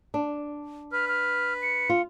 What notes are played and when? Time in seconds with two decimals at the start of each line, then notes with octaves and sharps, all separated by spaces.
0.14 D4
0.92 B4 F6
1.08 F6
1.62 C#7
1.90 F4